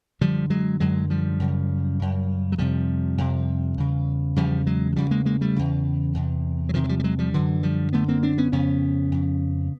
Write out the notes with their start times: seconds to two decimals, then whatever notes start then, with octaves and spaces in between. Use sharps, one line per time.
0.21 F#2 D3 F3 G3
0.50 F#3 G#3
0.80 F#2 D3 F#3 G#3
1.10 F3 G3
1.40 F#2 C#3
1.99 F#2 C#3
2.52 F#3
2.58 F2 C3 F3 G3
3.18 F2 C3
3.78 E2 C#3
4.36 E2 C#3 F3 G3
4.67 F#3 G#3
4.93 F#3
4.96 E2 C#3 F3 G3
5.11 G#3 A#3
5.26 G#3 A#3
5.41 G3 A3
5.56 E2 C#3
6.15 E2 C3
6.69 F#3
6.74 E2 C3 D#3 F3
6.84 F#3
6.89 F3 G3
7.00 G3
7.04 F#3 G#3
7.19 F3 G3
7.34 F#2 D3 E3 F#3
7.63 F3 G3
7.93 F#2 D3 A3 B3
8.08 A#3 C4
8.23 C4 D4
8.38 B3 C#4
8.52 F2 C#3 B3 C#4
9.12 F2 C#3